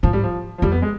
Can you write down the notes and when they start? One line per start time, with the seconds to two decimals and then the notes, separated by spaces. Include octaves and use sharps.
0.03 G#2 F3
0.13 G3
0.23 F3
0.58 F3
0.62 F2 G3
0.72 B3
0.82 G#3